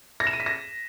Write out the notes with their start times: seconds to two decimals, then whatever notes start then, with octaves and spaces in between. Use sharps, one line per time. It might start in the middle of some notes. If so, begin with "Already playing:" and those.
0.20 A#6
0.27 E7
0.33 D#7
0.40 B6
0.46 A#6